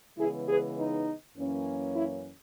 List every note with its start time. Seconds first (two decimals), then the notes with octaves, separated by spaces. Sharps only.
0.18 C#3 E3 G#3 B3 E4 G#4
0.48 G#4 B4
0.77 D#4
1.36 F#2 E3 A#3 C#4
1.96 E4